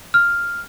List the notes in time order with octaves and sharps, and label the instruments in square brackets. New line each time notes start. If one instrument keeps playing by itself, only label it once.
[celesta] F6